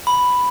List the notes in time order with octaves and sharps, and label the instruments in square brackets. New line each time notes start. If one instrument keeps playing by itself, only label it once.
[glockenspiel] B5